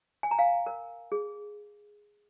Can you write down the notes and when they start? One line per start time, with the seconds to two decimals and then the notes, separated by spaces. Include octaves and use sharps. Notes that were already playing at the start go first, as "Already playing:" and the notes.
0.23 G#5
0.31 A#5
0.38 F5 G#5
0.66 A#4
1.12 G#4